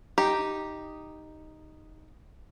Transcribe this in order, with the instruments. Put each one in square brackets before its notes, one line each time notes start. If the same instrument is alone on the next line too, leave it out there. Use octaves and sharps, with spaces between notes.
[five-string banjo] D#4 G4